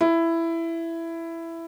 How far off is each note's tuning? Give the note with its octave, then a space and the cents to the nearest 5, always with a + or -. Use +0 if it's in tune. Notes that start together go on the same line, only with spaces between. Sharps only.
E4 +10